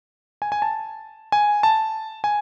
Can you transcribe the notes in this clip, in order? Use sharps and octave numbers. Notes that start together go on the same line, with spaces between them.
G#5
G#5
A5
G#5
A5
G#5